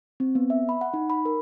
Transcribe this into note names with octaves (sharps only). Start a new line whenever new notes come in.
C4
B3
E5
B5
F#5
D#4
B5
A#4